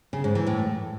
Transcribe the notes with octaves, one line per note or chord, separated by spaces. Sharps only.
C#3
G#2
E3
A2